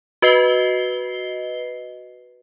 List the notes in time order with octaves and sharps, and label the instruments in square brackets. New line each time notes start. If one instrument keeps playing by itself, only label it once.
[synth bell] F#4 B4 D#5 C7 G7